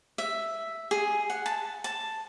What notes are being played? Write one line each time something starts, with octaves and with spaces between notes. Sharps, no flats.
E5
G#4
F#5
A5
A5